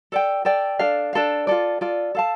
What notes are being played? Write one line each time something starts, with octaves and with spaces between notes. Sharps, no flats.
A4 D5 G5
A4 D5 G5
D4 A4 F5
D4 A4 F5
F4 A4 D5
F4 A4 D5
A4 F5 A5